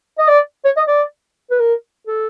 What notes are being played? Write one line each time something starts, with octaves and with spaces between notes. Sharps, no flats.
D#5
D5
C#5
D#5
D5
B4
A#4
A4